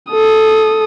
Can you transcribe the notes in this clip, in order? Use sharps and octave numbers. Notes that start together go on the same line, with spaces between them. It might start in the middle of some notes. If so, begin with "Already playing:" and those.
A4 D#6